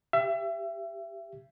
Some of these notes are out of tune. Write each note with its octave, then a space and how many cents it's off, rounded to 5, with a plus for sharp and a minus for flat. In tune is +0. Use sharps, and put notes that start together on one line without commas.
G4 +0 E5 +30